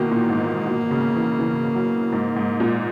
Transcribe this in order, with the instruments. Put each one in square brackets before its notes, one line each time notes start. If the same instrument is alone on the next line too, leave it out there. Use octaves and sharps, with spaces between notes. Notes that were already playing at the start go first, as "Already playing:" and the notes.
Already playing: [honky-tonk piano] B2 D#3 E3 [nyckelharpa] A#3
[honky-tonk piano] A#2
G#2
B2
C#3
E3
E3
F#3
G#2
G#2
A#2